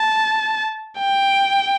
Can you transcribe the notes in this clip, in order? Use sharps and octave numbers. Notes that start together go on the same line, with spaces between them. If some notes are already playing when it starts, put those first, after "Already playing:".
Already playing: A5
G5